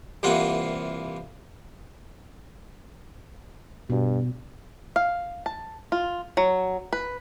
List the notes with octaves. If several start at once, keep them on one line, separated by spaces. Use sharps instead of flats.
C2 C3 E3 A#3 F4 F#5
G2 B2
F5
A5
F4
F#3
B4